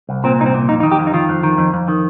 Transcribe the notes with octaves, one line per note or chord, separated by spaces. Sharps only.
C2
A#2 C4
C2 D#4
C4
A#2
F2 D#4
D#4
D#3
G4
F2
D#4
D#3 F4
F2
D#3
F2
F2
D#3